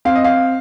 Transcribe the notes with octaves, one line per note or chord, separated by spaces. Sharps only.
C4 F5
D#5
F5